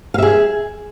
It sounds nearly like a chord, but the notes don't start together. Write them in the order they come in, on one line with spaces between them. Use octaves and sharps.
F5 E5 G#4